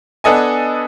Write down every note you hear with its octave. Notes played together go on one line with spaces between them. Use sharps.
B3 D4 A4 D#5 G#5